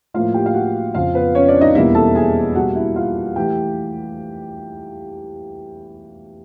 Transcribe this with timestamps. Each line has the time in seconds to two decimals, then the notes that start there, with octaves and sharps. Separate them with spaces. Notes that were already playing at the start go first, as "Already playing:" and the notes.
0.14 A2 F3 A#3 F4 F5
0.34 G4 G5
0.46 F5
0.54 F#4 F#5
0.95 F2 C#3 F3 F4 F5
1.15 B3 B4
1.35 C#4 C#5
1.48 D4 D5
1.61 D#4 D#5
1.75 E2 B2 G3 A#3 E4 E5
1.95 A4 A5
2.15 G#4 G#5
2.55 B2 G3 A#3 F#4 F#5
2.75 E4 E5
2.96 F4 F5
3.36 E3 A3 G4 G5